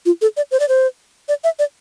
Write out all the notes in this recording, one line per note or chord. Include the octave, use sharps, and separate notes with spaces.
F4
A4
D5
C5
D5
C5
D5
E5
D5